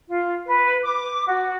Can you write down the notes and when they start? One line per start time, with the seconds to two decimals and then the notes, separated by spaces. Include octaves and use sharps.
0.08 F4
0.45 B4
0.83 D6
1.26 F#4